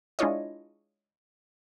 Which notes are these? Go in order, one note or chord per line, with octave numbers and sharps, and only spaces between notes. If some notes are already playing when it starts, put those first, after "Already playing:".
G#3 D4 E4 F4 C#5 D#5